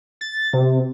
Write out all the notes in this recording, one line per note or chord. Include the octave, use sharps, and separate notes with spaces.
A6
C3